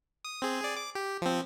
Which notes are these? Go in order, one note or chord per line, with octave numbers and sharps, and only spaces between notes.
D#6
C4 G#4
G#4 D5
D6
G4
F3 C4